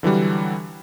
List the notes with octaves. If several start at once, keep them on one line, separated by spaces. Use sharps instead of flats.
D3 E3 F#3 G3